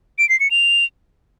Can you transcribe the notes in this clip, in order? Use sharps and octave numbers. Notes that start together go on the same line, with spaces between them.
D7
C7
C#7
F7